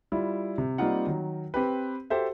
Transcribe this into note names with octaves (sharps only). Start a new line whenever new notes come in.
G3 E4 F4
C3
G3 A#3 C4 D#4 F4 F#5
D#3 F#3
C4 G4 B4
F#4 G4 A4 C5 E5